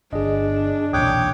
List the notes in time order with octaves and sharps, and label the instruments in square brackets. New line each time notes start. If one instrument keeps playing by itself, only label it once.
[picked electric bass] G1 [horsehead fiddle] D4 [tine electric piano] G#4 D#5
[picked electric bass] B1 E2 A#2 [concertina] C#5 G5 D6 [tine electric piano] D#6 F#6